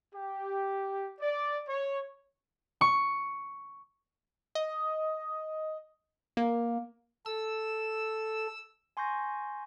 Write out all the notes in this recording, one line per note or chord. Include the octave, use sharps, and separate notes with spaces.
G4
D5
C#5
C#6
D#5
A#3
A4 E6
G#5 C6 C#6 G6 A#6